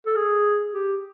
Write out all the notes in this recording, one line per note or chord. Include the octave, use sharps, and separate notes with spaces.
A4
G#4
G4